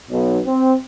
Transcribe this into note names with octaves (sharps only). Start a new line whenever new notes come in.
B1
C4